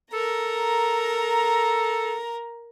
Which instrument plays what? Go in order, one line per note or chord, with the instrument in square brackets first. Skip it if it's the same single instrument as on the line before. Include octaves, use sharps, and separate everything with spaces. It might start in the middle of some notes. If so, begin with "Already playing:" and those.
[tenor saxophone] A4 [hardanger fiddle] A#4 [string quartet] A#5